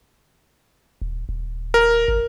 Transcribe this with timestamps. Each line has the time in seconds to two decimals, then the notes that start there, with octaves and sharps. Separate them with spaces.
1.02 D#1
1.29 D#1
1.74 A#4
2.08 G#1